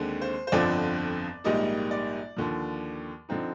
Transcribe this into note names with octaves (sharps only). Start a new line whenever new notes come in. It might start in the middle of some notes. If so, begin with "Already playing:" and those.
Already playing: D#2 D3 G#3 C4
C5
C5
G1 F2 D3 F3 C4 D5
A#1 G#2 G3 A#3 D#4 D#5
D5
D#2 D3 F3
D3 F3 C4 D#4